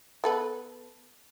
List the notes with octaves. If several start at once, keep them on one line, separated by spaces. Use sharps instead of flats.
B3 A4 B4